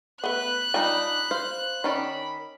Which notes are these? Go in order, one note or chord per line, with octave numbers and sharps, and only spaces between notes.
A3 B3 B4 F#6
G3 D4 D#4 F4 G5 G#5 B5
C5 F5
D#3 C#4 D5 B5